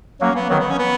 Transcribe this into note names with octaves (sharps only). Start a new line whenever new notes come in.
F#3 A#3 C#4
B3
D#3 F#3 B3
B3
C#4
B3